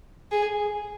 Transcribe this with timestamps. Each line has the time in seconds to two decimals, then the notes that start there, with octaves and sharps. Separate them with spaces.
0.31 G#4